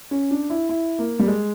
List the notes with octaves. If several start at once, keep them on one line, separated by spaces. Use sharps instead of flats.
C#4
D4
E4
E4
A#3
G3
G#3